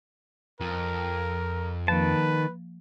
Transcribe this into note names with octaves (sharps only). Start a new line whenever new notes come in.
F2 A#4
D#3 F3 A#3 B4 A5